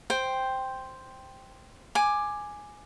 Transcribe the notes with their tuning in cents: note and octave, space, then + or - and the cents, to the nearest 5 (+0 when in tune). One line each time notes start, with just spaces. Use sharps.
C5 +0 G5 +0
G#5 +0 D6 +15